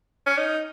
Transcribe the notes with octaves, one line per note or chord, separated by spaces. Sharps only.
C#4
D#4